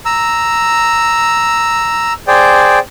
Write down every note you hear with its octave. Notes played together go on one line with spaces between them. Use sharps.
A#5 E6
G#4 C5 D5 G5